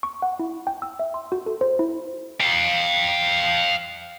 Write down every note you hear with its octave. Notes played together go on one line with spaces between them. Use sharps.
C#6
F#5
E4
G5
E6
E5
C6
F#4
A4
C5
E4
F5 G5